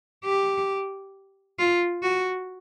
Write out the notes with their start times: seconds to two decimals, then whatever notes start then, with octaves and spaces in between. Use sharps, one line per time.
0.25 G4
1.59 F4
2.03 F#4